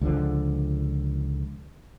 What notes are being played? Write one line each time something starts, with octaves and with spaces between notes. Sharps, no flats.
C#2 D3 F3